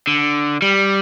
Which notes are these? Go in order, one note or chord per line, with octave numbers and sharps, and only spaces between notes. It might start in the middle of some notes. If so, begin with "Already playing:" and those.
D3
G3